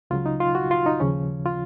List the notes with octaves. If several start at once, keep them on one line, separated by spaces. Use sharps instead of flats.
C#2 C#3 F#3 F4
D#4
F4
F#4
F4
D#4
D#2 C#3 F3 C#4
F4